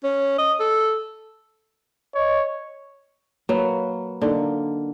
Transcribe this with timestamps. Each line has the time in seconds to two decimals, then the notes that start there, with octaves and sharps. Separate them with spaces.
0.04 C#4
0.38 D#5
0.60 A4
2.15 C#5 D#5
3.49 F#3 A#3 B4
4.22 D3 A#3 D#4